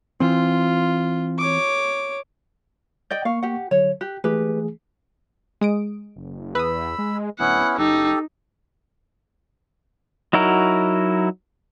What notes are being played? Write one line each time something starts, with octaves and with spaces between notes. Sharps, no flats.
E3 C4 F4
C#5 D6
D5 D#5 G5 G6
A#3 F5 C#6
G4 F#5
D3 F#3 C#5
G4 F#6
E3 A3 G4 G#4 B4
G#3 D#6 D7
F#1
E2 B4 B5 D#6 E6
G#3
D1 B3 C#4 E4 F#5
F#1 D#4 G4 A4
F#3 D#4 E4 F#4 A#4